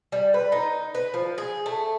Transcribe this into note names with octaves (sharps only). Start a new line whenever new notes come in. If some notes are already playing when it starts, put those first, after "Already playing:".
G3
B4
D#4
B4
F3
G#4
A3